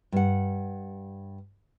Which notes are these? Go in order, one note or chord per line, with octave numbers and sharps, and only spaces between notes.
G2 F#5